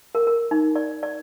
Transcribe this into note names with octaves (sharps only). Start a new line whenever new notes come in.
A#4
A#4
D#4
D5
D5